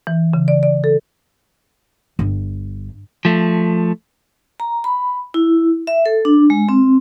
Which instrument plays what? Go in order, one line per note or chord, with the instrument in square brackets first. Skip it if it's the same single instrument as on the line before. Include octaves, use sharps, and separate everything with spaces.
[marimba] E3
C#3
D5
D5
A4
[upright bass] G1
[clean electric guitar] F3 A3
[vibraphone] A#5
B5
E4
E5
A4
D4
G#3
C4